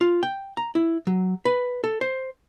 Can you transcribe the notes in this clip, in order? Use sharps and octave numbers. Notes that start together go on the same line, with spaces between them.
F4
G5
A#5
E4
F#3
B4
A4
C5